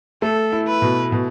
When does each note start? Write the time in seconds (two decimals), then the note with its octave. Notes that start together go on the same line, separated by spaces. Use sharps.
0.22 A3 A4
0.52 E4
0.67 B4
0.82 B2
1.12 B2